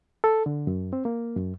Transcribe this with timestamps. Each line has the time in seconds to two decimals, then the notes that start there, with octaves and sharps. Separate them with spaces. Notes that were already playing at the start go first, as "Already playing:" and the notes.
0.24 A4
0.46 D3
0.67 F#2
0.93 C4
1.05 A#3
1.36 F#2